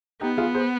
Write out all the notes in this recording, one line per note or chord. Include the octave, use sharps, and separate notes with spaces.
B3 D#4 G4
F4 G#4
G#4 C5